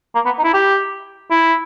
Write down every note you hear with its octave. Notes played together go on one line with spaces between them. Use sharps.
A#3
B3
D#4
E4
G4
E4